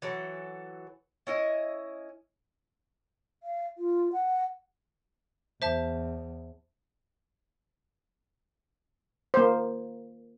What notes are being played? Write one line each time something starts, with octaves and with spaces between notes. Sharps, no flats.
E3 F#3 A4
C#4 E4 D#5
F5
F4
F#5
E2 C5 E5 A5
A#3 C5